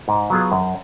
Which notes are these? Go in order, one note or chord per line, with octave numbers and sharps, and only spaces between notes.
G#2
F#3 B3 F4 G#4
F#2